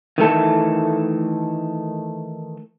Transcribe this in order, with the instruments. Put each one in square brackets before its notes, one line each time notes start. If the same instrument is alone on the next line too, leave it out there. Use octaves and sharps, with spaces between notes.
[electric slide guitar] D#3 E3 A3 A4